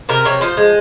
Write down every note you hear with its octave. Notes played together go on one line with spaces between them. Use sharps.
C3 A#4
C3 C#5
F3 C5
G#3